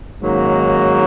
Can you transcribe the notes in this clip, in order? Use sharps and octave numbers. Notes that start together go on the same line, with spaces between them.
G#2 D#3 F#3 A#3 C#4